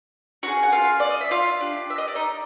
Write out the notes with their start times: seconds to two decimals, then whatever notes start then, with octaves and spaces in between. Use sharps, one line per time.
0.43 C#4 F4 F#4 G#4 F#5
0.63 F#5
0.72 F4 F5
1.00 D5
1.10 D#5
1.21 E5
1.31 F4 F5
1.60 D4 G4
1.90 E5
1.98 D#5
2.08 D5
2.15 D#4 D#5